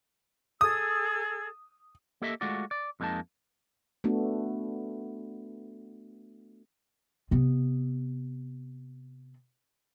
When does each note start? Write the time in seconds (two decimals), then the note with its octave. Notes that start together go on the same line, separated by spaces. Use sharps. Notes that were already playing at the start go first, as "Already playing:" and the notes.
0.61 G#4 A4 D#6 E6
2.22 A#3 G4 A4 D#5 E5
2.41 G#3 A3 F4 F#4 D5
2.71 D5
3.00 F2 G#3 A#3 D#4 A5
4.04 A3 B3 D4 F#4
7.31 C3 B3